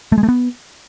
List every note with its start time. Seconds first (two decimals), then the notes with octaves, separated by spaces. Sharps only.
0.12 A3
0.18 G#3
0.23 A3
0.29 B3